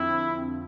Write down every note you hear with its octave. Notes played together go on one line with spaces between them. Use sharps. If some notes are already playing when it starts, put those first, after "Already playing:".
Already playing: F2 D3 F3 C4 E4